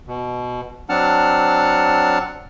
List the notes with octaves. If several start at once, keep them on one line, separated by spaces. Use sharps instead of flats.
B2
F#3 C4 D4 F#5 A5 F6